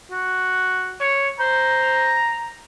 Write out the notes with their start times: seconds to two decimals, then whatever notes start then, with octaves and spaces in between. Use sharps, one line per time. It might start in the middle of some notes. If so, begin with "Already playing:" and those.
0.11 F#4
1.00 C#5
1.40 C5 A#5